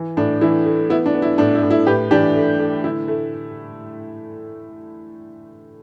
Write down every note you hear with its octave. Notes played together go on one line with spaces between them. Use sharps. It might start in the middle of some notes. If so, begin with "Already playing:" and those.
Already playing: E3
A2 D4
E3 E4
A3
B3 E4
D4
B3
E4
A2 D4
E4
A2
E4
A2 G4 B4
E3 D4 G4
A3
A3
D3 E4
A3